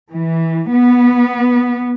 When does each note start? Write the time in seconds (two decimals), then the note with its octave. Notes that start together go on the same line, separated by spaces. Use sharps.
0.14 E3
0.70 B3